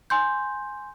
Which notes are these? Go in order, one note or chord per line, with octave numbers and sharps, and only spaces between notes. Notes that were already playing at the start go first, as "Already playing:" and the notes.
G#5 C6 G6